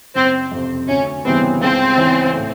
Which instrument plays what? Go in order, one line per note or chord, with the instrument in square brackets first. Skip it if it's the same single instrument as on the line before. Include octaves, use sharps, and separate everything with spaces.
[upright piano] F#1 [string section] C4
[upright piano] F2 C3
[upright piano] D2 [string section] C#4
[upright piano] C#3 E3 G3 B3 [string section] C4
[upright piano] C#2 [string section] C4
[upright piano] C#3 E3
A2